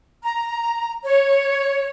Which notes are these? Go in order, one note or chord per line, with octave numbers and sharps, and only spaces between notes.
A#5
C#5